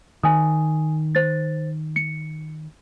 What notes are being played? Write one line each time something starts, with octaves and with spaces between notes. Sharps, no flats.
D#3 G#5 D#6
C5 A6
C#7